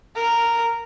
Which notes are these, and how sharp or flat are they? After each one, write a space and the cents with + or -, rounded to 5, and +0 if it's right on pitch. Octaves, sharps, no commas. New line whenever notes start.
A#4 -5